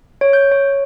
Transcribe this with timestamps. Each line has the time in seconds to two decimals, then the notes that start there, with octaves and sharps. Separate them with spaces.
0.21 C#5
0.33 G6
0.52 C#5